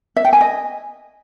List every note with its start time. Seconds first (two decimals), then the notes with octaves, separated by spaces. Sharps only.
0.16 E5
0.25 G5
0.33 G#5
0.41 D#5